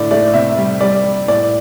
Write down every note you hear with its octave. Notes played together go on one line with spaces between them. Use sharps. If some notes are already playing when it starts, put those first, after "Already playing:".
Already playing: A2 D3 D5
A3 D5
C3 E5
G3
G3 D5
G3
A2 D5